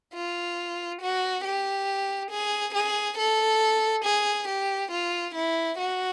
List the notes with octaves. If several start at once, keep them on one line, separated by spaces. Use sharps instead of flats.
F4
F#4
G4
G#4
G#4
A4
G#4
G4
F4
E4
F#4